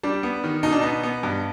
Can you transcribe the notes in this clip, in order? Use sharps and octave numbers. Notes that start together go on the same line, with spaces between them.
G3 D4
B3
D#3
B2 D#4
D4
B3 D#4
B3
G2